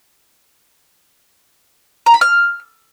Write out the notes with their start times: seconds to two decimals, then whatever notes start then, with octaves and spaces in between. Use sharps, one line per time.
2.06 A#5
2.14 B5
2.21 F6